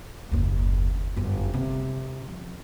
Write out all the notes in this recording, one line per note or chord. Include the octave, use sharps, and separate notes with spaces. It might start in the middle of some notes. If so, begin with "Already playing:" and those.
F#1 D#2
G1 F#2
C3
F3